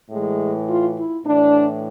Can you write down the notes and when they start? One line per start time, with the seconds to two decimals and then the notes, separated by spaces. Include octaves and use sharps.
0.11 A2 E3 G#3
0.68 F4
0.96 E4
1.25 A2 E3 D4